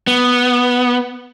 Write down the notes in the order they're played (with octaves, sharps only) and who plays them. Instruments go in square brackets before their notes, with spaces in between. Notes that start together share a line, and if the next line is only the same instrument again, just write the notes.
[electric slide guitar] B3